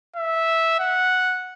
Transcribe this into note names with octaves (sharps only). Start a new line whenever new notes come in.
E5
F#5